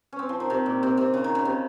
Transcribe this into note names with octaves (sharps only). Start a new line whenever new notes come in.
C#4
C4
F3
D#3
C3
A#2
C3
C3
C#3
D#3
C#3
C3